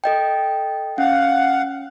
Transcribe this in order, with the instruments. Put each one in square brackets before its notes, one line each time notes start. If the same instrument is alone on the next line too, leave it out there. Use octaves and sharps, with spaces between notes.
[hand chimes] A4 D#5 G5
[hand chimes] C#4 [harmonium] F5 F#5